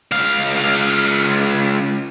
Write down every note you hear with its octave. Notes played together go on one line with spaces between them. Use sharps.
C#2 F5